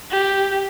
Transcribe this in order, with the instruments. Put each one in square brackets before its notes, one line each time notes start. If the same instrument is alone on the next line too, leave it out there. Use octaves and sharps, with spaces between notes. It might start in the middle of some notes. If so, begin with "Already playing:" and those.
[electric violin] G4